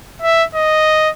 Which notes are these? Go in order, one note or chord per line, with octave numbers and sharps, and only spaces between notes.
E5
D#5